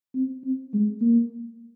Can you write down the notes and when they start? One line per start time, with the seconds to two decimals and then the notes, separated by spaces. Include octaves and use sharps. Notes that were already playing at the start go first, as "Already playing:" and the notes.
0.15 C4
0.44 C4
0.73 G#3
1.01 A#3